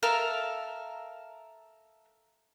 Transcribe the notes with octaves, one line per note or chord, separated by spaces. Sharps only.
A4 A#4 E5 F5